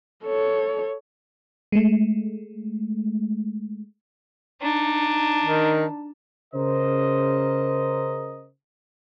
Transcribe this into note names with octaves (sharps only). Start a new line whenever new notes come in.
A4 C#5
G#3 A3
D4 D#4
D#3
C#3 A#4 C5 D#5